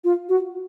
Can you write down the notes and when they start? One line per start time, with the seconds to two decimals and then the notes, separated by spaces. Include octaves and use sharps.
0.04 F4
0.29 F#4